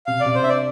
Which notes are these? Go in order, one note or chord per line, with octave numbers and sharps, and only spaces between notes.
C3 F5
D5
C3
C5
D4 E5
D5